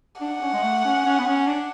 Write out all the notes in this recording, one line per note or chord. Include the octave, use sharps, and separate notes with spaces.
D4 F#5
C#4
G#3
A3
C#4
C#4
B3
C#4
D4